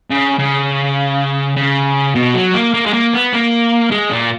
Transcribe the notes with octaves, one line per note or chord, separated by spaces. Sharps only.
C#3
C#3
C#3
B2
F#3
A#3
A#3
G#3
A#3
B3
A#3
G#3
A#2